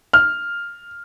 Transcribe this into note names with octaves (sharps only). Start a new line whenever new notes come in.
F6